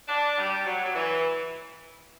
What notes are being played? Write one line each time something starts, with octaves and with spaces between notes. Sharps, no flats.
D4
G3
F#3
F#3
E3